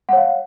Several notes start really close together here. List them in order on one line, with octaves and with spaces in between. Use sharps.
F#5 C#5 F5